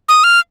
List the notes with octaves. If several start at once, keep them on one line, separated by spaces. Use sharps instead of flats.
D#6
F6